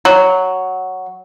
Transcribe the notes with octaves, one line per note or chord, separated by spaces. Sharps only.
F#3